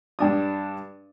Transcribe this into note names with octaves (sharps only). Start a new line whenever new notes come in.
G2 D4 D#6